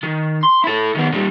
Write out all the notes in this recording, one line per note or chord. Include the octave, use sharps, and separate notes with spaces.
D#3
C6
E4 A4
D#3 B3
A#2 G3